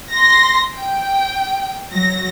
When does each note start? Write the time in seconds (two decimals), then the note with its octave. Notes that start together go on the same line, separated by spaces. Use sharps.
0.12 C6 A#6
0.76 G5
1.93 F#3 A#6